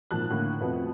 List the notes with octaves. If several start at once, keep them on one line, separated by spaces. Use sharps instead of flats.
G#1 A#2 F3 A5 F#6
A2 D3 A#3
F2 B2 F3 A3 B3 C4